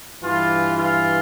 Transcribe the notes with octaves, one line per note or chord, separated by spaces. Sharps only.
G2 E3 F4
F4